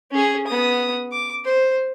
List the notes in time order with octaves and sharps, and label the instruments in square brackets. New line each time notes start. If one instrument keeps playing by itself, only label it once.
[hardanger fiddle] C#4 G#4
B3 D#6
D6
C5